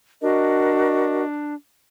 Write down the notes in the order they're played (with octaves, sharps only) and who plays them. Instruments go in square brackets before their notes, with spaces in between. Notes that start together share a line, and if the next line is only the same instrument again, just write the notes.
[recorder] D4 [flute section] F#4 A#4 D#5